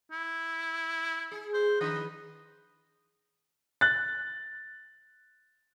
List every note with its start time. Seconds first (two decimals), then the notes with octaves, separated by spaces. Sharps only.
0.12 E4
1.31 G#4
1.54 C5
1.81 D#3 D4 B4 D#5
3.81 F#6 A6